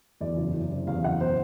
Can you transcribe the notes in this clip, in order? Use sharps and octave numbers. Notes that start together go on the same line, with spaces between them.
E2 D5
F#1
F#1
C3
E2 F5
F#1 F#5
B2 C5